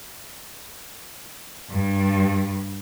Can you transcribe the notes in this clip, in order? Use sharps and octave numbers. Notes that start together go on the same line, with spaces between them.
G2